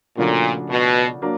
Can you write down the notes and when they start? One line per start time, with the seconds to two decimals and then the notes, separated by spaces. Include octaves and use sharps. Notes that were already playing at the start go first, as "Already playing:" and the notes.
0.18 A#2 C#3 F3 A3 D4 F#4
0.70 B2
1.22 F#3 A#3 D4